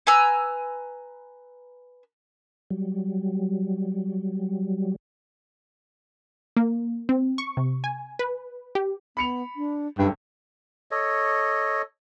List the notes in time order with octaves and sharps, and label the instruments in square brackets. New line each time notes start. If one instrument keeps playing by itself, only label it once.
[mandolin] B4 G#5 A#5 E6
[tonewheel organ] F#3 G3
[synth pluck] A#3
C4
C#6
C3
G#5
B4
G4
[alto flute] B3 [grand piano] B5 C#7 F7
[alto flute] D4
[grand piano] F#1 A4 [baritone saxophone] G2 [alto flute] G5
[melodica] A4 C#5 D#5